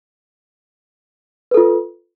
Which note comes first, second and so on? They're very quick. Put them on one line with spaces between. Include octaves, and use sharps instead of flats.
B4 A4 F4